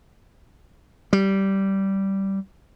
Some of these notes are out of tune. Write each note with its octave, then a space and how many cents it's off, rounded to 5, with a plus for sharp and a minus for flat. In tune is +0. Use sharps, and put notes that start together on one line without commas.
G3 -10